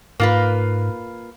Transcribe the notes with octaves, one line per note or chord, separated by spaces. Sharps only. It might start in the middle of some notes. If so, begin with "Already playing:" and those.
G#2 A#3 F4 B4